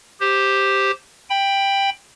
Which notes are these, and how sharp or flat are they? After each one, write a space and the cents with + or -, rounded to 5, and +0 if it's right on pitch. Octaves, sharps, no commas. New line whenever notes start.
G4 +0 C5 +0
G5 +10 B5 +0